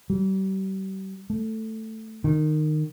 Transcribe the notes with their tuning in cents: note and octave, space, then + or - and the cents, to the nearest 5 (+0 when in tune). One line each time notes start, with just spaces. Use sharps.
G3 -35
A3 +5
D#3 -20